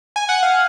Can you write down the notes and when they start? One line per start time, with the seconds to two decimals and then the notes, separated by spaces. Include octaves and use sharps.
0.16 G#5
0.29 F#5
0.43 F5